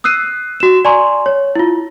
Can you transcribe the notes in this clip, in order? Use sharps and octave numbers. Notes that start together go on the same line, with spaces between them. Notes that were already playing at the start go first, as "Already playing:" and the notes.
D#6 E6 F#6 C7 D#7
F#4 E7
D5 G#5 A#5 C6 C#6
C#5
E4 F4